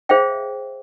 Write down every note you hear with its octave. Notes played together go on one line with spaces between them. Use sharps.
G#4 C5 C#5 E5 F5 G5